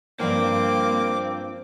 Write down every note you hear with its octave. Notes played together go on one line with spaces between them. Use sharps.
G2 F3 A#3 F4 C5 G5 D6